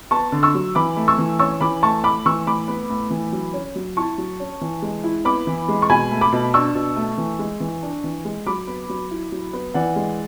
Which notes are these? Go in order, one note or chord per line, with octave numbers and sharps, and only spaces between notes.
B3 A5 C#6
D3
C#6 E6
F#3
E3 B5 D6
A3
C#6 E6
E3
C#4 C#6 E6
E3 B5 D6
A3 A5 C#6
A2 B5 D6
E3 C#6 E6
A2 B5 D6
B3
A2
E3
F#3
C#4
F#3
E4 A5 C#6
F#3
C#4
E3
G#3
E4
B3 B5 D6
E3
G#3
C#6
B2 G#5 B5
A3
B5 D6
B2
D4 C#6 E6
B2
A3
E3
G#3
E3
D4
E3
G#3
F#3 B5 D6
B3
F#3
E4
F#3
B3
E3 D5 F#5
G#3